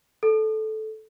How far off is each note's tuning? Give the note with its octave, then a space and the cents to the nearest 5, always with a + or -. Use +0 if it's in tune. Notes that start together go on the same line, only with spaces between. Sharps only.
A4 -15